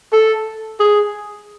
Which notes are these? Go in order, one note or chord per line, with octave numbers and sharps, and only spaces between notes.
A4
G#4